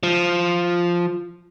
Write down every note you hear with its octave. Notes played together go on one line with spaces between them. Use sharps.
F3